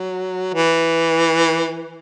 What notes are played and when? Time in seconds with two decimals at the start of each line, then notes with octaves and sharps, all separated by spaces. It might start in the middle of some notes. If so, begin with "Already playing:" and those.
Already playing: F#3
0.54 E3